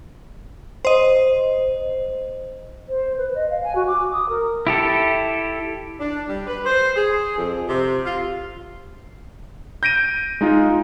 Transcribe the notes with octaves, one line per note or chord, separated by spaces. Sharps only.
C5 D#5
C5
B4
D#5
F5
G#5
F#4
D6
D#6
A#4
E4 G4 A4
D4
G3
B4
C5
G#4
F2
C3
F4
G6 A#6 D7 D#7
G#3 D#4 F4